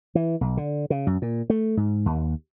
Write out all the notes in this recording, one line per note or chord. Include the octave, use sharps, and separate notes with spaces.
E3
B1
D3
C#3
F#2
A#2
A3
G#2
D#2